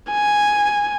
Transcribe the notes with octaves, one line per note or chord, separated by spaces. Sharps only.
G#5